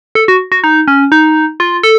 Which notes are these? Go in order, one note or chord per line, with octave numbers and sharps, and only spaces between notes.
A4
F#4
F#4
D#4
C#4
D#4
F4
A4